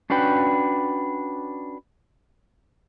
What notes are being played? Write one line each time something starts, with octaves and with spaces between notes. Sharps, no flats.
C#4 D4 F#4 B4 G5